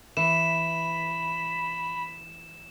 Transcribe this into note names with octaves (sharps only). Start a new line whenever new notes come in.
E3 B5 E7